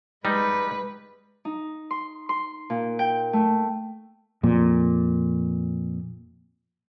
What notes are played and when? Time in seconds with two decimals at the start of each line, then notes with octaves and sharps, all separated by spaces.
0.25 G3 G#3 D#4 B4
1.45 D#4
1.91 C6
2.29 C6
2.70 A#2
2.99 G5
3.33 A3
4.43 F2 A#2